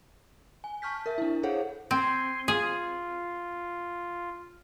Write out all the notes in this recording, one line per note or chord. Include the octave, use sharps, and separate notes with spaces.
G#5
A5 C#6 F6 G6 B6
A#4 E5
D4 E4
G#4 A4 C5 C#5 F5 F#5
C4 G#5 C6
F4 G#4